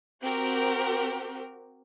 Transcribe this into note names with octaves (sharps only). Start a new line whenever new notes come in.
C4 F#4 G4 A#4